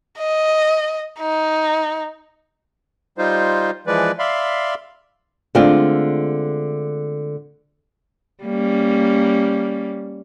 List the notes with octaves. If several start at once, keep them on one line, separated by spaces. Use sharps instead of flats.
D#5
D#4
G3 D#4 F4 C5
E3 F3 G#3 B4 D5
D5 E5 F5 B5 C6
D3 G#3 A3 C4 F4
G3 A#3 C#4